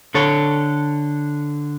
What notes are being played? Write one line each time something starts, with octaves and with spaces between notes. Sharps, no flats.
D3 A4 C#5